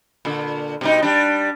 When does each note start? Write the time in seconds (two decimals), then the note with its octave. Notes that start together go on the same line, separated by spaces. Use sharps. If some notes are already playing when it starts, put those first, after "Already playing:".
0.25 A#2 D3
0.81 B2 G3 D#4
1.02 G3 D4